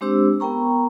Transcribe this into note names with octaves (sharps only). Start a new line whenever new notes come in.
G#3 C4 D4 G4 C5 E6
B3 A#4 G5 A#5 C#6